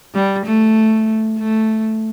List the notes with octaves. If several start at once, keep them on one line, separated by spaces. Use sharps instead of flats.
G3
A3
A3